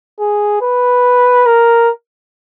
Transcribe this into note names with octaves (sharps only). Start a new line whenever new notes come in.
G#4
B4
A#4